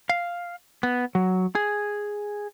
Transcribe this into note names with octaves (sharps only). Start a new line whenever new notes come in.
F5
B3
F#3
G#4